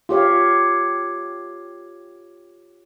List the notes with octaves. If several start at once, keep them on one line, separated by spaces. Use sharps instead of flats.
F4 G4 C#5 F5